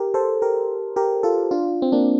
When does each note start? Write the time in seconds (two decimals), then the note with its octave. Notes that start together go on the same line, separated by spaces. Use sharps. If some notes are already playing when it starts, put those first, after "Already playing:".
Already playing: G4 A#4
0.14 A4 C5
0.42 G4 A#4
0.96 G4 A#4
1.23 F4 A4
1.51 D4 F4
1.82 C4
1.92 A#3 D4